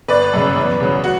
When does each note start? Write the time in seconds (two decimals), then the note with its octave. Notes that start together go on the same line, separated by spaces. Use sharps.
0.08 G1 B4 D5
0.33 F#2 C#3
0.56 E2
0.80 C#3 F#3
1.04 F#4